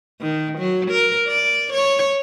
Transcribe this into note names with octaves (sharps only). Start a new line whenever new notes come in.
D#3
F#3
A#4
D5
C#5